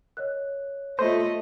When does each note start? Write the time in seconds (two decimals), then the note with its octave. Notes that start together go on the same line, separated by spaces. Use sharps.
0.17 A#4 C#5 D#5 F#6
0.99 A3 F4 G4 A4 C5 D#5